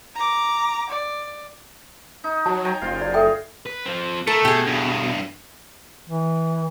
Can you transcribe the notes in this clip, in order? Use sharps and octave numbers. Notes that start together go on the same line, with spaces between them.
A#5 D6
D5
D#4
F#3 A5
G5 G#5 A#5
F#1 F4 C5 F5
D5
G#4 A4 E5 G5
B4
F3 C4
C#2 A3 A4 A#4
B2 G4 G#4
E2 G2
E3